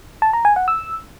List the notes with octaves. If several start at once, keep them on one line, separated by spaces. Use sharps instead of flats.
A5
A#5
G#5
F#5
E6